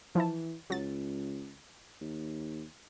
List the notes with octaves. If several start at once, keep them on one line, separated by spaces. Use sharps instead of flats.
E3 F3 E4 A5
C#2 F#3 A6
D#2